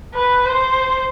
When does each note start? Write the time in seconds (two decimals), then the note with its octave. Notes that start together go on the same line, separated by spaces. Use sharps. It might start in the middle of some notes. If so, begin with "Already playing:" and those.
0.14 B4
0.45 C5